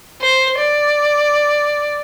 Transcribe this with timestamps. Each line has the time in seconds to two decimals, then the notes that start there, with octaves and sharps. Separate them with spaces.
0.21 C5
0.59 D5